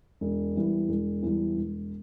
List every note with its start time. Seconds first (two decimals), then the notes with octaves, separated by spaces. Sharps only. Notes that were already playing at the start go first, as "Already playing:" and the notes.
0.21 E1
0.55 E2 E3 G3
0.89 E1
1.22 E2 E3 G3
1.56 E1